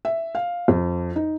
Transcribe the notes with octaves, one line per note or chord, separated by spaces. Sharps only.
E5
F5
F2
D#4